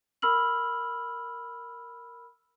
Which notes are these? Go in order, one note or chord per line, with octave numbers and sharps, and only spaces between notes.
A#4 B5 E6 F6 F#7